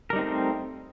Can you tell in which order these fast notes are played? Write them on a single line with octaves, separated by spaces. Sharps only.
A#4 G3 D#4 C4 A3